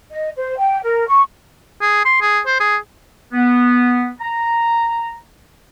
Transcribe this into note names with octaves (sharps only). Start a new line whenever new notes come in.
D#5
C5
G5
A#4
C#6
G#4
C6
G#4
C5
G#4
B3
A#5